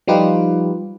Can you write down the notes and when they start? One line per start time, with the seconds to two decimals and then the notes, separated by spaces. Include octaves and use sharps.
0.08 F3 G3 D#4 F4 G4 B4